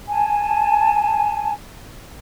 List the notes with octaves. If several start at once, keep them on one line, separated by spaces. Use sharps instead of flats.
G#5 A5